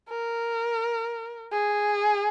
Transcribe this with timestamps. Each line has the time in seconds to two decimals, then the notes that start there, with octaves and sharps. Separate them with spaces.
0.09 A#4
1.52 G#4